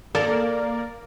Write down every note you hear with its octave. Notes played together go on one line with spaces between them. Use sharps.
A#3 A4 A#4 D5